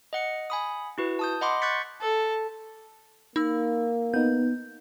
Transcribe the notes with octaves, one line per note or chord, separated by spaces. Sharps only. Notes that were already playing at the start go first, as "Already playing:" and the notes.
D#5 F#5 C#7
G#5 B5 D#6
E4 F#4 B4
A5 D#6 G6
D#5 F#5 B5 C6 D6
C#6 F#6 G6 A6 B6 C#7
A4
A#3 D#4 E6
B3 D#4 G6